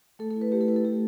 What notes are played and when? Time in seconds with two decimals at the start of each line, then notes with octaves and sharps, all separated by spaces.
0.19 A3 A4
0.31 A4
0.36 E4
0.42 B4
0.52 A3 G4
0.61 A4
0.68 E4 B4
0.76 A4
0.84 A3 G4